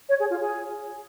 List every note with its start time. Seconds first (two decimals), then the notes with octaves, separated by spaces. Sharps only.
0.09 C#5
0.20 G#4
0.30 F4
0.41 G#4